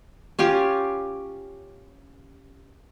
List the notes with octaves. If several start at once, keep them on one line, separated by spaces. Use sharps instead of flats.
C#4 F4 G4